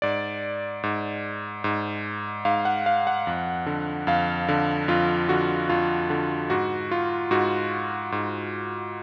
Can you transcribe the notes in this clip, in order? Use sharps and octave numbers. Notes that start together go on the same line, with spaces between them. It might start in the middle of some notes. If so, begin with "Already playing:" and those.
G#2 D5
G#2
G#2
G#2 F5
F#5
F5
F#5
F2
D3
F2 F5
D3
F2 F4
D3 F#4
F2 F4
D3
G#2 F#4
F4
G#2 F#4
G#2